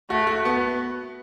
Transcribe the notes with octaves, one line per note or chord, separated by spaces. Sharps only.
A3 F#4
F#4
B3